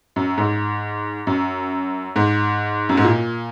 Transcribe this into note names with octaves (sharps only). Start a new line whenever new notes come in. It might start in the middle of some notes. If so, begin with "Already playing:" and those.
F#2
G#2
F#2
G#2
F#2
G#2
A#2